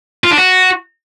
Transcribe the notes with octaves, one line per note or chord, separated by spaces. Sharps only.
F4
D4
F#4